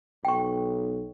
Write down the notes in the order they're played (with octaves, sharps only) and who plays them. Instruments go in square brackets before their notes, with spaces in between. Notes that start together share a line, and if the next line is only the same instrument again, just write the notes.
[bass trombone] B1 [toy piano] G5 C#6